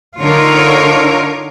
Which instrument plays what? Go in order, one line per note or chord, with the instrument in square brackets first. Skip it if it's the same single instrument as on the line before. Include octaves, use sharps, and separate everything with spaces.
[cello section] D3 D#4 F4 A#4 C#5